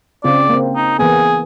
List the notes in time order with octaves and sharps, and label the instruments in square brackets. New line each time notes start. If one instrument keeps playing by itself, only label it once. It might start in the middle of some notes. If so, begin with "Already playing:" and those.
[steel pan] C#3 C4 F4 [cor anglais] D5
[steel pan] A#3 C4
[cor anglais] D#4
[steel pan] E3 A#3 B3 [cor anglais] G#4